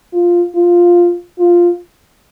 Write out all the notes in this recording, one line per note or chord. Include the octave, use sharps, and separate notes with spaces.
F4
F4
F4